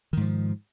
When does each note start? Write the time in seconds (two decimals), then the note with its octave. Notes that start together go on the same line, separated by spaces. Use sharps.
0.13 D#3
0.17 G#2
0.21 F3